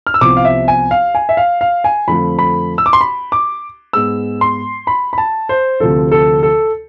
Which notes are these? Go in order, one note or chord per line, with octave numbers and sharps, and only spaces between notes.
F6
E6
C2 C3 F3 B3 D6
F5
E5
G#5
F5
G#5
E5
F5
F5
G#5
F2 D3 F3 A3 B5
B5
E6
D6
C6
B5
D6
G#2 G#3 B3 E6
C6
B5
B5
A5
C5
D2 C3 F3 A4
A4
A4